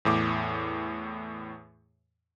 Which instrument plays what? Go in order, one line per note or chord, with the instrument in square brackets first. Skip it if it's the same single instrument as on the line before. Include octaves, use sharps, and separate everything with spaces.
[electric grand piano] E2 A2 D6